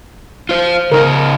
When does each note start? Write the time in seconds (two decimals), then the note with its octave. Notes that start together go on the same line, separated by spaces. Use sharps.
0.49 F4 C5
0.92 C#3 D#4 G#4 A#4